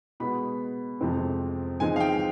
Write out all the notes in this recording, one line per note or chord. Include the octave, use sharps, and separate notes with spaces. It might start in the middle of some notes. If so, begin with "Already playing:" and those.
B2 G#3 B3 B5
F2 C3 F3 G#3 C4
G#2 F3 G#3 C4 D#4 G#5
F5
G5